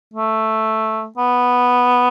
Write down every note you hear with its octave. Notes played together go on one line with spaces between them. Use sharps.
A3
B3